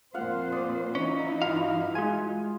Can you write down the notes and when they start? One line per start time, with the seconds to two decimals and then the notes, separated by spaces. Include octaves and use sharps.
0.14 F2 A#2 F4 C5 F5 F#5
0.52 D5 D#6
0.95 E3 C#4 D#4 E4
1.42 G2 F4 F#4 F5
1.95 G#3 F4 G#4 G#5